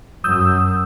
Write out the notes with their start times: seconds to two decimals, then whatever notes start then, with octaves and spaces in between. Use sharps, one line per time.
0.24 F#2 D#6 E6 G6